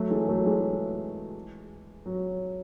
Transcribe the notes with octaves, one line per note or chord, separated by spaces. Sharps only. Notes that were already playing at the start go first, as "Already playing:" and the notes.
Already playing: F#3 A3
E3 G#3
F#3 A3
E3 G#3
F#3